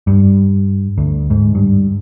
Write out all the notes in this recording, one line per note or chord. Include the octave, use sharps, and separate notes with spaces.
G2
D2
G#2
G2